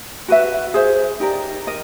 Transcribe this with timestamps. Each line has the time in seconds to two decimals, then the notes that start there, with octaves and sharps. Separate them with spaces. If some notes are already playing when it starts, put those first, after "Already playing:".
0.28 F#4 B4 E5
0.74 G#4 C5 E5
1.20 D#4 G4 A#4 D5
1.67 A#4 D#5